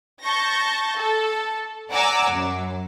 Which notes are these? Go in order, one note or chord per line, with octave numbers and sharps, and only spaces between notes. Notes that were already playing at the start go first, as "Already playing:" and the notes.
A5 C#6 G6 A#6
A4
D5 F#5 G#5 A#5 D6 E6
F#2